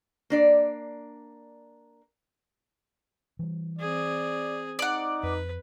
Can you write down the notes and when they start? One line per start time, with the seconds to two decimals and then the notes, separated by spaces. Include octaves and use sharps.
0.30 A#3 D4 D5
3.39 E3 G3
3.79 C4 G#4 D5
4.79 D#4 D5 F#5
5.23 F2 B4